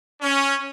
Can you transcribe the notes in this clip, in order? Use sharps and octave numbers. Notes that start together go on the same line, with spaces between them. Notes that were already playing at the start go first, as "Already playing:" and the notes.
C#4